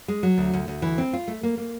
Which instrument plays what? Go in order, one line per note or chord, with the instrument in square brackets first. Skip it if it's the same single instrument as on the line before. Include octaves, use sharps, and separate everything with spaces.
[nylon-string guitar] G#3
F#3
D2
D2
D2
E3
C4
F4
A3
A#3
A#3